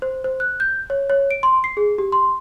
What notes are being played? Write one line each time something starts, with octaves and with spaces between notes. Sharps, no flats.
C5
C5
F#6
G6
C#5
C#5
D7
C6
C7
G#4
G4
C6